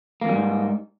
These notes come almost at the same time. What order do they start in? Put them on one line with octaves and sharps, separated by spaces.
A#3 E2 G3 G#2